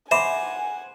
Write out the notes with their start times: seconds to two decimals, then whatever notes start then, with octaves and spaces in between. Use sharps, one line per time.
0.11 C5 E5 F#5 G#5 B5 D6